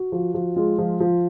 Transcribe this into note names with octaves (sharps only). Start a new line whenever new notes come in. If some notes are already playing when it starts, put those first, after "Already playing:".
Already playing: F#4
F3
F3
G#3 F4
F3
F3